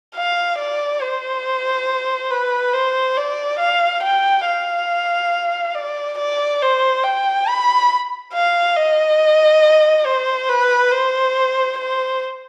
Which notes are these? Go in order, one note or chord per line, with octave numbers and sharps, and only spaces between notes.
F5
D5
C5
B4
C5
D5
F5
G5
F5
D5
D5
C5
G5
B5
F5
D#5
C5
B4
C5
C5